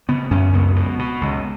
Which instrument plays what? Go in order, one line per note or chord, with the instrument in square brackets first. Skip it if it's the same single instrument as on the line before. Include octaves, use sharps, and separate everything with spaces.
[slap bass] C#3 B3
F#2 C#4
C#2 B3
B2
B2
C#2